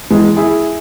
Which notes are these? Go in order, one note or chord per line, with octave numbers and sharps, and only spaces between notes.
E3 G#3
E4 G#4